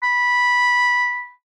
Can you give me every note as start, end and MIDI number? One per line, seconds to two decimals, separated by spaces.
0.03 1.31 83